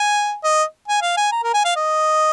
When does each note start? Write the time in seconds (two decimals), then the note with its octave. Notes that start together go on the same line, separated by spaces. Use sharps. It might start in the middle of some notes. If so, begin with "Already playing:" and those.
Already playing: G#5
0.44 D#5
0.88 G#5
1.02 F5
1.17 G#5
1.32 A#5
1.43 A#4
1.54 G#5
1.65 F5
1.76 D#5